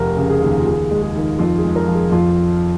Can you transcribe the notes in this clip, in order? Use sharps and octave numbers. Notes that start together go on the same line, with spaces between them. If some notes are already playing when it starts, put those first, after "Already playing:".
Already playing: F1 A#4
C#3
G#4
D#2
F4
D#2 G#4
G#3
G#4
D#3
F2 F4
G#4
G#3
A#4
F3
G#4
F2 F4